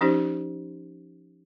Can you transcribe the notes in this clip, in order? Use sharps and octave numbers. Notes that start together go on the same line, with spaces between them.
F3 C#4 D#4 G4 C5